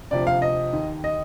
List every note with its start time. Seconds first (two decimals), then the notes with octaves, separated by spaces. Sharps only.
0.11 D2 C3 F3 D5
0.27 F5
0.42 D#5
0.73 D#2 D#3
1.04 D#5